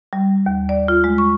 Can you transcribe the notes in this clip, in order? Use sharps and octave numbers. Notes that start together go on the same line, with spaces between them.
G3
D#2
D5
F4
G#3
C#6